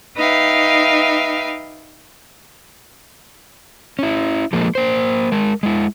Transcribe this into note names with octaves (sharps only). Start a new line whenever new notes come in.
D#4 B4 E5 F5 G5
C#4 E4
F3 G#3 A#3
A#3 C5
G#3 A#4
G#3 E4